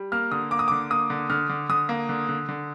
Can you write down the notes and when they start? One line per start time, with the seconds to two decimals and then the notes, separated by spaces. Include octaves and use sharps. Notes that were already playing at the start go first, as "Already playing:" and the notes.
Already playing: G3
0.12 A#3 F6
0.32 D3 D#6
0.51 A#3 D6
0.59 D#6
0.68 D6
0.71 D3
0.90 A#3 D#6
1.10 D3
1.30 D3 F6
1.50 D3
1.69 D3 D#6
1.89 A#3
2.09 D3
2.29 D3
2.49 D3